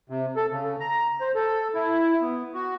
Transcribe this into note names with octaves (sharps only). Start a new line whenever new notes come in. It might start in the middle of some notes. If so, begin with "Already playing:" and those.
C3
A4
C#3
A#5
C5
A4
E4
B3
F#4